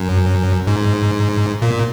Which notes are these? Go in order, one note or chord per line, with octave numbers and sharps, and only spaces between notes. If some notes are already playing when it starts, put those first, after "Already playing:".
Already playing: F#2
G#2
A#2